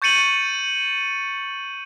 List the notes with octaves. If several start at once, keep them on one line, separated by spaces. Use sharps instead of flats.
C#6 G6 A6 C#7 D#7 F#7